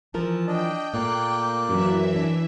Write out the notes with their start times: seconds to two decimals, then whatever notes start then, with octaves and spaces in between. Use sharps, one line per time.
0.14 E3 F3 A#4 A5
0.47 D4 D#5 G5
0.94 A#2 A3 A#3 D5 F#6
1.70 F#2 E3 E5
2.16 D4